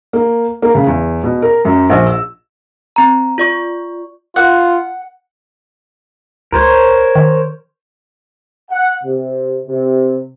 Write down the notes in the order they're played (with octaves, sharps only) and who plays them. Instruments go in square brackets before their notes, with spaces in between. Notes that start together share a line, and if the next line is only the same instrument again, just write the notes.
[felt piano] A#3
A#3
C#3
E2
B2
A#4
F#2
A#1
E6
[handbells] C4 A#5
F4 D5 C#6
[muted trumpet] F4 [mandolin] F#5
[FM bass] C#2 [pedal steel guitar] A#4 C5 C#5
[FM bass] D#3
[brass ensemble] F#5
C3
C3